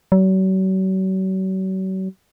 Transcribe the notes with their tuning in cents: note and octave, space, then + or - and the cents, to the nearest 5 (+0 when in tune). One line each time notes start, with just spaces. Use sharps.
F#3 +40